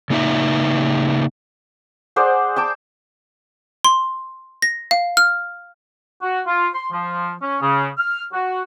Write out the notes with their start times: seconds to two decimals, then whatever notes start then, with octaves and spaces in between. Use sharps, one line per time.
0.10 C#3 A#3 D#4 E5
2.16 G#4 C5 D5 F#5
2.56 G5 A5 D6
3.85 C6
4.62 A#6
4.91 F5
5.17 F6
6.22 F#4
6.47 F4
6.73 C6
6.91 F3
7.42 C#4
7.61 C#3
7.98 F6
8.33 F#4